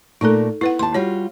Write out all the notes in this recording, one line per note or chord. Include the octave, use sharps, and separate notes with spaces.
A#2 A3 D#4 A4 A#4
B3 E4 B4 F#5
D#2 A5 C6
G3 F4 F#4 C#5